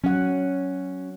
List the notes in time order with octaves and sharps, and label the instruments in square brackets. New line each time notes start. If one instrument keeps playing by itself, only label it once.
[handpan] F#3 F#5 [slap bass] C#4